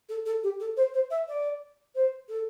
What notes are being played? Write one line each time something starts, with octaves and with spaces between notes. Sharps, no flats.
A4
A4
G4
A4
C5
C5
E5
D5
C5
A4